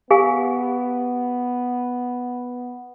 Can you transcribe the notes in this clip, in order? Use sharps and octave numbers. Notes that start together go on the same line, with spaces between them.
B3 G4 F5 G#5